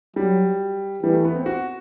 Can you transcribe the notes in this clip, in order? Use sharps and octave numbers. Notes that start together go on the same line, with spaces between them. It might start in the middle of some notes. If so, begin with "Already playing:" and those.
F#3 G3
E3 G3
A3
B3
C4
F#4